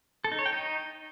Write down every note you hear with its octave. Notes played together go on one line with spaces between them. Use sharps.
A4
D#4
C#5
G5
D#4